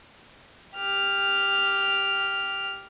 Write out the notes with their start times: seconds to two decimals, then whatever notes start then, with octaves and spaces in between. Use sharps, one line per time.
0.76 G4 F6